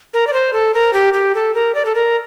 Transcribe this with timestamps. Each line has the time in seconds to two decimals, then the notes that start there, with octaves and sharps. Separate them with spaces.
0.14 A#4
0.27 D5
0.33 C5
0.53 A4
0.74 A#4
0.93 G4
1.13 G4
1.35 A4
1.54 A#4
1.75 D5
1.85 A4
1.95 A#4